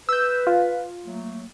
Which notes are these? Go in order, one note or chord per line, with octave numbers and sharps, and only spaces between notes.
B4 E6 G6
F4
F#3 A3 A#3